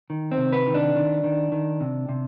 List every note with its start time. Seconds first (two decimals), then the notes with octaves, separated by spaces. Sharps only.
0.10 D#3
0.32 C4
0.38 C3
0.52 B4
0.67 D#3
0.74 D4
0.96 D#3
1.24 D#3
1.52 D#3
1.81 C3
2.09 C3